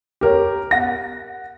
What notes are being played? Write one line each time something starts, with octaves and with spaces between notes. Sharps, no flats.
G4 A#4 C#5
F#5 A#6